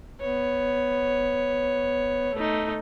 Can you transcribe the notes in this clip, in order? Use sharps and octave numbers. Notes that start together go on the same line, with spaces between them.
B3 C#5
A3 D#4